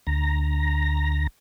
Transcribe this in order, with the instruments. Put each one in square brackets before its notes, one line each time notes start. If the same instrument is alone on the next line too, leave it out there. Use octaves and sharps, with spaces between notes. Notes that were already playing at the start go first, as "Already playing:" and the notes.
[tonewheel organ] D2 A#5